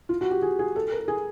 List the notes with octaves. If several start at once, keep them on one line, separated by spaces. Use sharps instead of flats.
F4
F#4
G4
G#4
G#4
A4
A#4
G#4